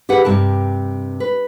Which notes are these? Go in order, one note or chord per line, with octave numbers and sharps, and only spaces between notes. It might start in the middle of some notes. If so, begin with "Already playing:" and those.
G4 G#4 B4 F#5
G2 C3 A#4 A5
B4